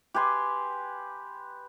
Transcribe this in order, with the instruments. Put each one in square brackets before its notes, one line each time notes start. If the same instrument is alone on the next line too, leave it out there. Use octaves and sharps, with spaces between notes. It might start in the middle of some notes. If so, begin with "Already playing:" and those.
[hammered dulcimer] G4 B4 G#5 C6